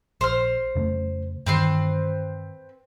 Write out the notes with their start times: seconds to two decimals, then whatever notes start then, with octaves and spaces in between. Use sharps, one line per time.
0.21 A#1 C5 F6
0.75 F2 C#3 A3
1.46 G2 D#3 E3 C4 B4 C6